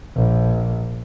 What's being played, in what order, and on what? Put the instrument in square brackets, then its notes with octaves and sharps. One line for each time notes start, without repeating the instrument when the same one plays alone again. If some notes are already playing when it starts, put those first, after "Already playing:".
[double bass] A#1